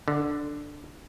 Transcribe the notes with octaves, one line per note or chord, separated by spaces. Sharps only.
D3